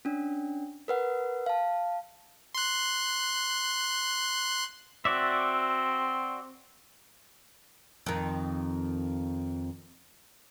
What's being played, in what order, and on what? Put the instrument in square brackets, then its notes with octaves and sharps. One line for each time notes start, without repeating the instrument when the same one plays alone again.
[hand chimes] C#4 D4
A#4 B4 F#5
F5 A5
[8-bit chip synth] C6 F#6
[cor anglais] C4 [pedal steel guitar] F#4 D5 E5
[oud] F2 D#3